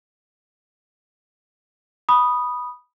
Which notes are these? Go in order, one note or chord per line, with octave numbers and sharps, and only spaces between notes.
B5 D#6